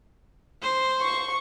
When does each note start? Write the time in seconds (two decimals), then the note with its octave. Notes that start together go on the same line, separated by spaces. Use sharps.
0.62 C5
1.02 C#6